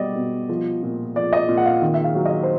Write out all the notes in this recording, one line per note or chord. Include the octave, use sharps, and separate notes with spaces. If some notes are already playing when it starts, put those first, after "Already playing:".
Already playing: B2 G3 D5 D#5
B2
F3
A#2
F3 D5
D#5
A#2
F#5
F5
D#3
E5
F5
F#3
D#5
C5